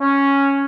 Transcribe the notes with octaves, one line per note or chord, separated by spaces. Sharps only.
C#4